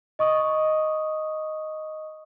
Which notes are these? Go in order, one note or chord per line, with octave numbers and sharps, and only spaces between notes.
D#5 C#6 D#6